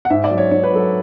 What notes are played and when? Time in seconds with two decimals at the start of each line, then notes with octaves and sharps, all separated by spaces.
0.05 F#5
0.10 G#2 E5
0.24 D5
0.31 F#3
0.38 C#5
0.51 G#2 C#5
0.64 B4
0.72 F#3 A4